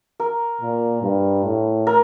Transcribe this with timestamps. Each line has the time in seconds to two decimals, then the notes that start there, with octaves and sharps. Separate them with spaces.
0.20 A#4
0.61 A#2
1.03 G2
1.45 A2
1.87 A#4